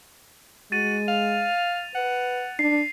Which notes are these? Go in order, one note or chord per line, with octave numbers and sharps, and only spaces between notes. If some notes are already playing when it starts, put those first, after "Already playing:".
G#3 F#4 A6 D#7
F5 F7
B4 F#5
D4 C7